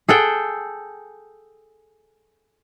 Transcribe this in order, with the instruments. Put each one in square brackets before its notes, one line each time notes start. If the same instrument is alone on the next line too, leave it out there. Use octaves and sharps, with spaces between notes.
[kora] G#4 A4 F#5 G5